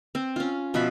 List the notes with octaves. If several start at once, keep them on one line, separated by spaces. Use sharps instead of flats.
C4
C#4 F4
B2 F3 B4 E5